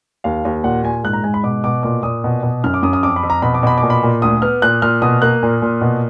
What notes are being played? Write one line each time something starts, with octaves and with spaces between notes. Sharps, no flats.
D#2 F5
D#2
A#2 F#5
A#2 G#5
G#2 F#6
A#5
G#2 G#5
B5
B2 D6
B2 D6
A#2 D6
A#2 D#6
B2
B2
F#2 F6
D6
F#2 D#6
D#6
F2 D6
B5
F2
A#5
B2 B5
D6
B2 B5
D6
A#2
B5
A#2
D2 D#6
B3 F6
A#2 F#6
A#2 F6
B2 D#6
A#3 F#6
A#2
A#2
B2